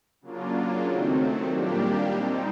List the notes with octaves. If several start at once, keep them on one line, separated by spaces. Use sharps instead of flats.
C#3 F#3 A#3 D4 F4
D#3 F#3 A3 C4
A#2 G3 A#3 D4 G4
G3 C4 D#4